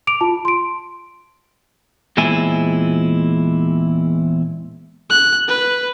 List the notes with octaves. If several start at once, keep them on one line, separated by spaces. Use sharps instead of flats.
D6 D7 F7
F4 A5
C6 D7
E2 A#2 G#3 C4 E4 G#5
F#6
B4